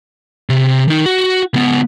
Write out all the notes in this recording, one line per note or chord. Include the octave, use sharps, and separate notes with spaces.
C3
D#3 D#4
F#4
C#2 B3